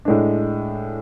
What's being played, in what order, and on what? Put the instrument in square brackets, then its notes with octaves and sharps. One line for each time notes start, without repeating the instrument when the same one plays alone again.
[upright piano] A2 G#3 D4